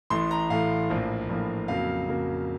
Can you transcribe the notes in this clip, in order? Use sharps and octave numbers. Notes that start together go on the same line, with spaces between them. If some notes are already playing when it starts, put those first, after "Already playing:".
A1 A2 A3 C6
A#5
A1 A2 A3 F5
A#1 A2 F3 A#3
A#1 A2 F3 A#3
F2 C#3 F#3 A#3 F5
F2 C#3 F#3 A#3